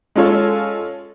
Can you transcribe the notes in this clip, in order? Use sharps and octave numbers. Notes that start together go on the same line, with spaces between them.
G#3 C#4 F4 A4 C#5